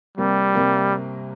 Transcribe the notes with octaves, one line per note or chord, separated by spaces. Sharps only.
C2 C3 G3 A#3
C2 C3 A#3